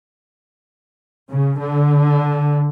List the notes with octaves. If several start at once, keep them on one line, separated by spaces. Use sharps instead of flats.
C#3
D3